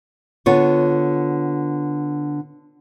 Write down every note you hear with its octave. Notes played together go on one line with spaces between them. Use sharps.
D3 B3 F4 C#5